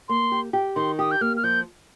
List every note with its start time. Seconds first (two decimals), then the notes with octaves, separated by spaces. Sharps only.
0.09 A#3 C6
0.32 G4
0.53 G4
0.76 D#3 C6
0.99 G4 D#6
1.11 G6
1.21 A#3 F6
1.37 F6
1.44 F3 G6